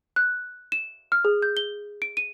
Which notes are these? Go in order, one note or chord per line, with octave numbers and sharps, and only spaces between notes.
F#6
E7
F6
G#4
G6
G7
D7
D#7